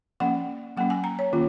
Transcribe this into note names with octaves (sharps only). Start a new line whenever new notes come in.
F3 A#3 C#4 F#5
F#3 A#3 C#4 F#5
G#5
A#5
C#5
D#3 A#3 C#4 F4